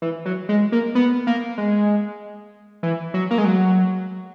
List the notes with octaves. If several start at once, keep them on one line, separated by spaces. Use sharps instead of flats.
E3
F#3
G#3
A#3
B3
A#3
G#3
E3
F#3
A#3
G#3
F#3